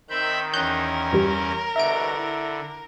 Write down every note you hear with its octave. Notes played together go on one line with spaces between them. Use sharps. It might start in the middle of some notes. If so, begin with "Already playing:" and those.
D#3 C4 E5 B5 G6
E2 C#4 A#4 F#6 G6
G2 E3 G3
C2 B2 D3 E3 E5 D7
E4